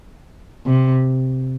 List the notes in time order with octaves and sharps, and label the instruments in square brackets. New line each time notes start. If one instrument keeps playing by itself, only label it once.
[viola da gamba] C3